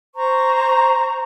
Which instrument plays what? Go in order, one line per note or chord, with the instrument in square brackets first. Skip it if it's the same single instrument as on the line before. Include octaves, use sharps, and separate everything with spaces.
[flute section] C5 A#5 C#6